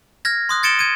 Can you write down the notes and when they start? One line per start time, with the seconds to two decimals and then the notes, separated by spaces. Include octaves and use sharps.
0.25 F6 G#6 A#6
0.49 C6 D#6 F#6
0.63 G#6 A6 C#7 D7 E7 G7
0.79 G#6 D#7